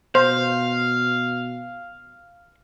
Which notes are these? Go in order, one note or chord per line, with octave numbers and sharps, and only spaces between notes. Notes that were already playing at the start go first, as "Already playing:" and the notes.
B2 C5 F5